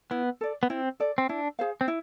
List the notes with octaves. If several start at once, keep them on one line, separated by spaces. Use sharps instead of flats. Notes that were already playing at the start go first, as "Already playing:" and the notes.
B3 E4
A4 D5
B3
C4 E4
A4 D5
C4
D4 E4
G#4 C5 F5
C4
E4